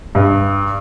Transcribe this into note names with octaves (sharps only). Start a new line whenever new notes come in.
G2